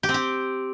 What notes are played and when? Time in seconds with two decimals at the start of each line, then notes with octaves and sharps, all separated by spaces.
0.03 G4
0.09 C4
0.14 G4